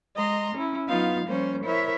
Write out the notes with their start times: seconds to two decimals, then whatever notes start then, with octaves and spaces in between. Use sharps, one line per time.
0.15 G#3 D#5 A#5 C6
0.55 C#4 E4
0.88 F#3 B3 D#4 F4 F5
1.25 F3 G3 A#3 C#4 C5 C#5
1.64 E4 A#4 C5 C#5 E5